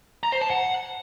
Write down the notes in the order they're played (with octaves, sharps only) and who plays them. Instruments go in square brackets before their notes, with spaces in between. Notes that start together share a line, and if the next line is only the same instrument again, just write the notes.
[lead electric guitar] A#5
C5
A5
F#5